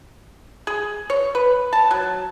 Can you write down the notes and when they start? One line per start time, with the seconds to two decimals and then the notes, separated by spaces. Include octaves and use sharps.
0.67 G#4
1.10 C#5
1.35 B4
1.73 A5
1.91 F#3